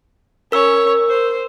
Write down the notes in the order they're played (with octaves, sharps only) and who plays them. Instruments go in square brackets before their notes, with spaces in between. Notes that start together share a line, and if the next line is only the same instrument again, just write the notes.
[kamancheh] C#4 C#5 [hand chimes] A#4 E6
[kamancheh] C5